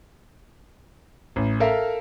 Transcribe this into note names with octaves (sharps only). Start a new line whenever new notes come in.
A1
A4 A#4 E5 F5